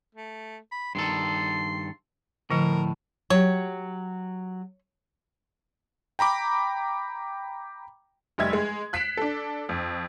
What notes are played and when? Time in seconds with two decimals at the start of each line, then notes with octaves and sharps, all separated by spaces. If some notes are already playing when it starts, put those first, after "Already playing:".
0.15 A3
0.72 B5
0.95 G2 D#3 A4 C6
2.50 A2 D3 F3 A#4
3.30 F#3 G4 C#5
6.19 G5 A#5 B5 D6
8.38 F1 G3 D#5 E5 G#6
8.53 G#3
8.93 F#6 B6 C7 D7 E7
9.17 D4 A4
9.69 F2